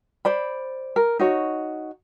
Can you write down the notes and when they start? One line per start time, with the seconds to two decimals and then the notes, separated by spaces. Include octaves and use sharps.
0.25 C5 D5 B5
0.96 A#4
1.19 D#4 F#4 C#5